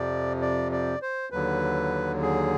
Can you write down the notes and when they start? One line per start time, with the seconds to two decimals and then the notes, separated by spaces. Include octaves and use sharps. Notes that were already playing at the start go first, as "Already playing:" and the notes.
Already playing: F2 C3 F3 D5
0.42 D5
0.72 D5
1.02 C5
1.31 D#2 D3 F#3 B4
2.22 G#4